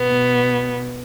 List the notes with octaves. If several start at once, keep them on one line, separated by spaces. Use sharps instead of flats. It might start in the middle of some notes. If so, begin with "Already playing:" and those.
Already playing: B2 B3